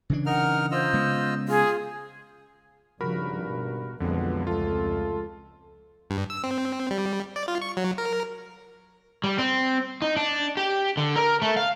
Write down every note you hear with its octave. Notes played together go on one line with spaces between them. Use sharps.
C#3 E3 D4
D#4 A#4 F#5 F6
F4 C5 D#5 E6
C#3 G#3 B3
F4 G#4
G#1 G2 C#3 F3 F#4 A#4 B5
B2
B1 F2 D3 E3 F#3 G#3 B3
C#2 A3 F4 A4
G2
E6
C4
G3
D5
F4
C#6
F#3
A#4
G3
C4
D#4
D4
G4
D3
A#4
A3
F5